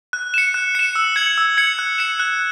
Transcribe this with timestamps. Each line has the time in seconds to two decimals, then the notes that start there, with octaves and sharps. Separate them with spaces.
0.13 F#6
0.34 C#7 E7
0.54 F#6
0.75 C#7 E7
0.95 E6
1.16 G#6 C#7 F#7
1.38 E6
1.57 G#6 C#7 F#7
1.79 F#6
1.98 C#7 E7
2.20 F#6